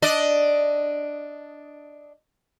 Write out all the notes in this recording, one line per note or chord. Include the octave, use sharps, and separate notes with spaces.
D4 D5 D#5